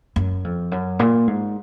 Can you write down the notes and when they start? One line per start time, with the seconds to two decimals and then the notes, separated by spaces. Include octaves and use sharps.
0.16 F#2
0.44 F2
0.72 F#2
0.99 A#2
1.27 G#2